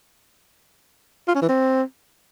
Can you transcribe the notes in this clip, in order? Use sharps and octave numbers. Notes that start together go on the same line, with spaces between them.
F4
C#4
E3
C4